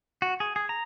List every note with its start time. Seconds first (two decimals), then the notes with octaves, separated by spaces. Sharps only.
0.22 F#4
0.40 G#4
0.56 G#4
0.69 A#5